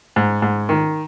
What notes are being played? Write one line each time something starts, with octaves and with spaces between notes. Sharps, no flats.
G#2
G#2
D#3